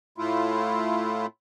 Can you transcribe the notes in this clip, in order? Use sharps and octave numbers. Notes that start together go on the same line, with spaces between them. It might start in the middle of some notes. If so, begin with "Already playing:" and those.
A2 A3 E4 F4